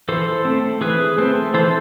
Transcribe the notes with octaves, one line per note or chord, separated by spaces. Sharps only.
E3 A4 C5
A3 C4
E3 G#4 B4
A3 C4 A4 C5
E3 A4 C5